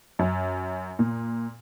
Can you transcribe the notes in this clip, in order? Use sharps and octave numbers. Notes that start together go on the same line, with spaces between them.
F#2
A#2